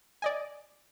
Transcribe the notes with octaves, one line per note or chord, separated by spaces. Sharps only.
D5 D#5 G#5